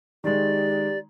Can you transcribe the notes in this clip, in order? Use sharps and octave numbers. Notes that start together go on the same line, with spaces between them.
D#3 G#3 G4 D5